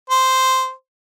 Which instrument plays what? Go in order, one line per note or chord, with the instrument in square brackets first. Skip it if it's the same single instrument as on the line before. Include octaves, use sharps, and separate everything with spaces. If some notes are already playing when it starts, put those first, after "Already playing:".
[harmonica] C5